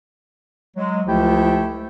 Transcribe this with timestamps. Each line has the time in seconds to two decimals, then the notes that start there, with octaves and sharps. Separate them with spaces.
0.76 F#3 G#3
1.07 C#2 F3 A3 E4 G4 G5